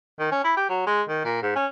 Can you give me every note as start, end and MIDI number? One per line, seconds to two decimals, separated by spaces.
0.19 0.29 51
0.31 0.43 61
0.44 0.53 64
0.57 0.67 67
0.69 0.84 54
0.86 1.02 56
1.09 1.20 51
1.25 1.38 46
1.42 1.52 44
1.55 1.66 61